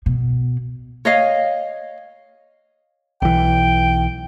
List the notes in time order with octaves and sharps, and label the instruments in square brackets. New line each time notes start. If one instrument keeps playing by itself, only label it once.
[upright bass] B2
[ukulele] C#5 D#5 F5
[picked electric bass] B1 E3 [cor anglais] G5